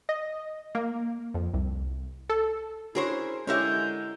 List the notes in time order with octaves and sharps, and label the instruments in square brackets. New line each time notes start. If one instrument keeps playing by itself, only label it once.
[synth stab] D#5
A#3
F2
C2
A4
[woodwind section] C#4 E4 [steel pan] D4 F#4 C#5 [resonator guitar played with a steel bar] G#4 A#4 C5
[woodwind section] D3 G#3 [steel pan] C#4 G4 [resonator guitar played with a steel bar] E4 A#4 C#5 [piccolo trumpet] G6